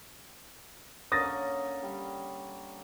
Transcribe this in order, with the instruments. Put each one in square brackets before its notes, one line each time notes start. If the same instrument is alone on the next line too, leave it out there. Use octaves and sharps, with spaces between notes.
[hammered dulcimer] D3 A#3 C#4 [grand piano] D#6 A6 A#6
[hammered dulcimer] G3